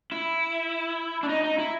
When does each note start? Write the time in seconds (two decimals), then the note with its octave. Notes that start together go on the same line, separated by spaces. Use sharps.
0.12 E4
1.23 D4
1.29 D#4
1.43 D#4
1.58 E4